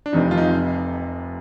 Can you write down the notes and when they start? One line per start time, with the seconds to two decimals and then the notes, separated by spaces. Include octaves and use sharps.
0.06 D4
0.13 F1 F2 C3 D#4
0.31 F4
0.37 D#4